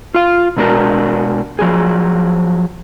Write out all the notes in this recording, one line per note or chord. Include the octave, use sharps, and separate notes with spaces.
F4 F5
B2 G#3 D4 F#4 A#4
F3 F#3 G#4